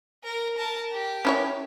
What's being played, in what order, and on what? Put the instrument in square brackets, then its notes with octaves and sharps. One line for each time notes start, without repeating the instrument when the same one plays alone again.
[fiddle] A#4
A#4 A5
G4
[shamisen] C#4 E4 C#5